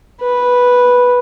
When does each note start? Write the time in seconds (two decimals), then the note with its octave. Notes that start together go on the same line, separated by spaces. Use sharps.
0.22 B4